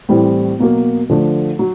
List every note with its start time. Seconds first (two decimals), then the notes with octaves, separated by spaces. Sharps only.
0.09 A2 E3 G3 C4
0.59 B2 F#3 A#3
1.10 D3 F3 A3
1.59 F#3